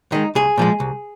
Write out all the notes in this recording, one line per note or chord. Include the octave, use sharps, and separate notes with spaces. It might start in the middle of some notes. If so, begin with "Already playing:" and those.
D#3 G#3 D#4
C2 G#4
A#2 F3 G#3
C2